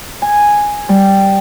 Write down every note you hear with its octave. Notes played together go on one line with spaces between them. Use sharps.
G#5
G3